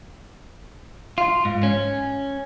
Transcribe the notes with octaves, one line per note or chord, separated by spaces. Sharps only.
F4
G#2
C#4